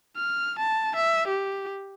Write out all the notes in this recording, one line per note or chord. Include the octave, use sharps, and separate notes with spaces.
F6
A5
E5
G4